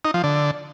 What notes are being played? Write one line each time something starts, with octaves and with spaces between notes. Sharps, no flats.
D#4
F3
D3